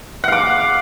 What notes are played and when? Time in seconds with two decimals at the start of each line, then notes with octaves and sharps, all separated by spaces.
0.24 F#5
0.28 F5
0.32 D6